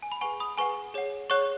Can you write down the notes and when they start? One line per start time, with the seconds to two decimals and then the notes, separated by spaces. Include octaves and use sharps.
0.02 G#5
0.12 B5
0.21 G#4 B4 F#5 G#5 C#6
0.40 B5 D#6
0.58 G#4 B4 F#5 G#5 C#6
0.94 G#4 C#5 F#5
1.30 G#4 C#5 F#5 C#6 F#6